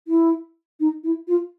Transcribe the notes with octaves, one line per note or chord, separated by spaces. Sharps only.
E4
D#4
E4
F4